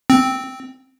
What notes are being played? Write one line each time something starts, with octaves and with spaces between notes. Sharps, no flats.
C4